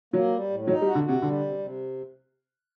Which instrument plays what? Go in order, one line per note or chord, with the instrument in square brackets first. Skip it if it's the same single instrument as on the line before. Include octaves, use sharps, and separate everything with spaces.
[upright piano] F#3 [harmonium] A#3
[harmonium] G3
A2
[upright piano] F#3 [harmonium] D#4
[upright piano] G3
[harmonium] F#4
[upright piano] D3
[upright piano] C3 [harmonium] F#4
[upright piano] D3 [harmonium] G3
[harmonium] C3
C3